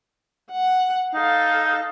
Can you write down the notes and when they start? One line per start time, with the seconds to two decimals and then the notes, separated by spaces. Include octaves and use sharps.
0.51 F#5
1.14 D#4 A4 F5